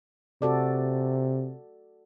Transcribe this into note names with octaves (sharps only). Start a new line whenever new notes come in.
C3 F#4 A4 D5